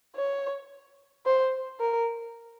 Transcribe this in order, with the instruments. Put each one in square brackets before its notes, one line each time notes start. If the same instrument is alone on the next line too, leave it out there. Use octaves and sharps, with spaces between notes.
[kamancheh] C#5
C5
A#4